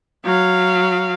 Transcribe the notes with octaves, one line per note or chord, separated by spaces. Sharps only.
F#3 F5